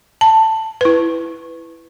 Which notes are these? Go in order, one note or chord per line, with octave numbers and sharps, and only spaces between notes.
A5
E4 B4